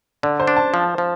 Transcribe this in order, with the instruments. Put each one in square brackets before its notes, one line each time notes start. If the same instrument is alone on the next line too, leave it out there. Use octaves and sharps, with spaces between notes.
[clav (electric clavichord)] D3 [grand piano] D5
[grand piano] C5
[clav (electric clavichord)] D4
[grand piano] A5
[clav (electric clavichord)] F3
F3